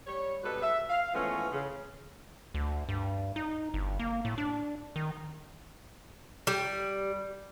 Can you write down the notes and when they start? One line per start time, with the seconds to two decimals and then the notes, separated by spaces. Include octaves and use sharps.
0.07 G3 C#5
0.43 G#2 B2 G3 A4 B4
0.62 E5
0.89 F5
1.13 E3 F3 G#3 A3 B3 C#4
1.52 C#3
2.54 D2
2.89 G2
3.36 D#4
3.74 G1
3.99 A#3
4.25 A2
4.38 D4
4.96 D#3
6.47 G3